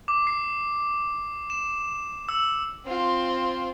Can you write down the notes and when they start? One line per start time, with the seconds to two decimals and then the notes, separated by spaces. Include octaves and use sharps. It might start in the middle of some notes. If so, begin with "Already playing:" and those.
0.08 D6
0.27 C7
1.50 E7
2.29 E6
2.86 C4 F4